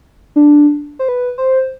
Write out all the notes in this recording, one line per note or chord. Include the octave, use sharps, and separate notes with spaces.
D4
C5
B4
C5